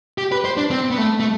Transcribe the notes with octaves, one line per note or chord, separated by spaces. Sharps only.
G4
B4
C5
D4
C4
B3
A3
A3